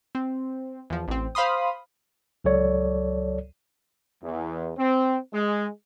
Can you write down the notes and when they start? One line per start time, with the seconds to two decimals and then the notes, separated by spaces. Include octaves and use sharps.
0.15 C4
0.90 E2 F3
1.08 A1 C4
1.35 C5 F5 B5 C6 D#6
2.44 C#2 F#3 A4 C#5 D5
4.22 E2
4.79 C4
5.34 G#3